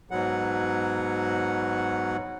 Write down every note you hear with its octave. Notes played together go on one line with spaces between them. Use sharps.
G#2 B2 F#3 F#5